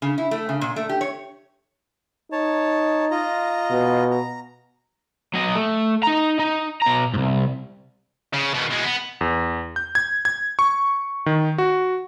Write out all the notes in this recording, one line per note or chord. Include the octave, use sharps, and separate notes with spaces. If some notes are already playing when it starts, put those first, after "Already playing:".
C#3
E4
A3
C#3
A#2
A3
G4
C#5
D#4 C#5 A5
F4 D#5 A#5
B2
A#5
F#3 D#5
A3
D#4 A#5
D#4
B2 A#5
C2 G#2
C#3
B2 D#3
B2 G#3
B3
E2
G6
G#6
G#6
C#6
D#3
F#4